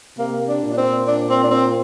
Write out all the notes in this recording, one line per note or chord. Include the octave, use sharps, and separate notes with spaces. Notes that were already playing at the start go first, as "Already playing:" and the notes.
C3 A#3
D4
A#2
D4
C4
D4
C4
D4
C4